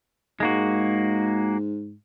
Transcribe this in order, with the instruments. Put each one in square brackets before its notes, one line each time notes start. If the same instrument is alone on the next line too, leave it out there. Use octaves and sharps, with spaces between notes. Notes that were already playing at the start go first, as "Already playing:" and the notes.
[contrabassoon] G#2 [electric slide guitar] G#3 A#3 F#4